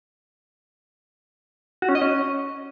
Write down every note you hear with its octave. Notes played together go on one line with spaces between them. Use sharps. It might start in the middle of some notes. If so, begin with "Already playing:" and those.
F#4
C#4
D#5
C#4